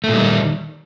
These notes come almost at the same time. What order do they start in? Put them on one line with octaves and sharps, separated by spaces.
A3 A#2 G3 D#3